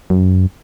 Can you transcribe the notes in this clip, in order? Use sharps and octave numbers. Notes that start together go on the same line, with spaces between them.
F#2